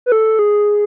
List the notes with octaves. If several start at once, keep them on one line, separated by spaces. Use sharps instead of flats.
B4
A4
G#4